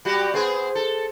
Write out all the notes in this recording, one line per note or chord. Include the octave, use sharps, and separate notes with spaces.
G3 F#4 G4
B3 C4 G#4
A4